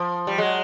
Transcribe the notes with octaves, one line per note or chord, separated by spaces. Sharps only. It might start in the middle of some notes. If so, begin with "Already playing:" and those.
Already playing: F3
G3
F#3 G#3